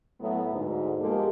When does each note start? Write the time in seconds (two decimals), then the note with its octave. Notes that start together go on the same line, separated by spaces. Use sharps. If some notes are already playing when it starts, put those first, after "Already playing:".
0.20 A2 F#3 A3 B3
0.52 D2 G#2
0.99 B2 F3 G#3 A#3 G4 A4